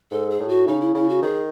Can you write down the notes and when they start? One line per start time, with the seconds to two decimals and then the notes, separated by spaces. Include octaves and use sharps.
0.11 G#2 A4
0.30 G#4
0.40 A2
0.49 F#4
0.67 C#3 D#4
0.81 E4
0.95 C#3 E4
1.09 F#4
1.22 D#3 G#4